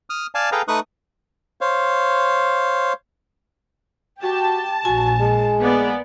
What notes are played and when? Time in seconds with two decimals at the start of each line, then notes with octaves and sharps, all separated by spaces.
0.10 D#6 F6
0.35 D5 F5 G#5 A5
0.52 G#4 A4 B4 F5 G5 A#5
0.68 A3 D#4 B4 C#6 D#6 F#6
1.61 C5 C#5 F5
4.23 F#4 G4 A5
4.85 A#1 F#4 G#5
5.20 G#3
5.60 A#3 B3 D5